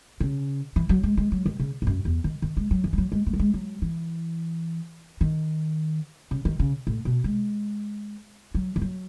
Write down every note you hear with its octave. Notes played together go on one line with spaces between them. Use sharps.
C#3
E3
F#3
G#3
G#3
F#3
D#3
C#3
G#2
F#2
E2
D#3
D#3
G#3
F#3
E3
G#3
F#3
G#3
A3
F#3
G#3
F#3
E3
D#3
C#3
D#3
C#3
A2
B2
G#3
F#3
E3
F#3